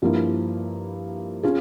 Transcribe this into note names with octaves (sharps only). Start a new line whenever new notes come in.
G2 F3 A#3 E4
C#4 F4 G#4